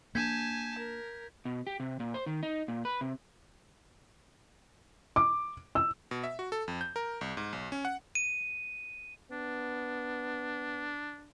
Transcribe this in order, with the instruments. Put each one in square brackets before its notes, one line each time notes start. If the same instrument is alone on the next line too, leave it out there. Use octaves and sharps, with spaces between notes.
[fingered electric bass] A#3 D4 [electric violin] G#5 A5 [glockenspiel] G6 G#6 B6
[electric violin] A#4
[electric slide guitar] B2
G4
C3
A#2
C5
D#3
D#4
A#2
B4
C3
[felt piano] D6
E6
[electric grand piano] B2
E5
F#4
A4
F2
G6
A#4
C2
G#2
B1
C#4
F#5
[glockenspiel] D#7
[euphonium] B3 [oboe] D4